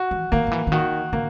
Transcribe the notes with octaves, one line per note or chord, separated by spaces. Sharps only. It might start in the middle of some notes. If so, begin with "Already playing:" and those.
Already playing: F#4
E3
D#3 A#3
D#3
E3
D3
D#3 F#4
D3 A#3